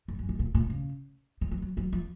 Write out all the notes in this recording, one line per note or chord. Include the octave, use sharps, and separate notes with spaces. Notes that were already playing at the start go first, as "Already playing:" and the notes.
F2
F#2
G#2
A#2
A#2
C#3
D#3
F#3
F#3
F#3
F3